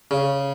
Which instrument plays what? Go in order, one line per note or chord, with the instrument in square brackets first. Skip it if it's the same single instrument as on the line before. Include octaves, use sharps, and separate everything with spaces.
[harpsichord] C#3